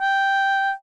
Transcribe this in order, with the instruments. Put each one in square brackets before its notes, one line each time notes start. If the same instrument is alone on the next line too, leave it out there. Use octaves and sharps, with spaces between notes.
[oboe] G5